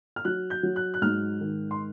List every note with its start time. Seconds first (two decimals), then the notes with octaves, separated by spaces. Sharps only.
0.16 F6
0.25 F#3 F#6
0.50 G6
0.63 F#3
0.76 F#6
0.94 F#6
1.02 G#2 F6
1.40 D#3
1.71 C6